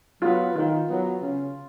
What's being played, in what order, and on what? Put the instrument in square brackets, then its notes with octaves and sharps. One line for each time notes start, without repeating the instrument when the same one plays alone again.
[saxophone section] F#3 B3 [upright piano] F4
[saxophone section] D#3 [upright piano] F4
[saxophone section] F#3 B3
C#3